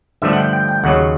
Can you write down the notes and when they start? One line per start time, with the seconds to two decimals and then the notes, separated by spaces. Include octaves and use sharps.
0.22 G2 D3 F3 A3 E5
0.33 F#5
0.37 G5
0.53 G5
0.69 G5
0.84 D#2 C#3 F#3 F#5